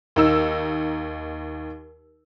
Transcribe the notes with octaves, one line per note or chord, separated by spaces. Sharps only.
D#2 D#4 E6